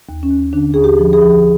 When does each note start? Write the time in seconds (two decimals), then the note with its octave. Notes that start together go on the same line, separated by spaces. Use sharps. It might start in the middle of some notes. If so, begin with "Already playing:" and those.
0.09 D#2
0.23 C#4
0.31 D#2
0.53 D3 D4
0.74 D#2 G#4
0.84 G4
0.99 F3
1.13 G#4
1.21 F3